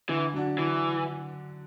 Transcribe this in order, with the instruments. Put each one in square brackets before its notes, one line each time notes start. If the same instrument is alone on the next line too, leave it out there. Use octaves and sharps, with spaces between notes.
[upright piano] D3 [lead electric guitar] E3
[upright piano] F#3 D4 F#4
[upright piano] D3 [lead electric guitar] E3